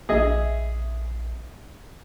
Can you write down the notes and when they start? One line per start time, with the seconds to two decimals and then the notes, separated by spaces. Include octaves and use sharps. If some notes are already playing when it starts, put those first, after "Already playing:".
0.09 A#1 G#4 D#5 E5